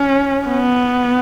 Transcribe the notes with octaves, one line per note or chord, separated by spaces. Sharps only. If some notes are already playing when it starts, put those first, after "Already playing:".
Already playing: C#4
B3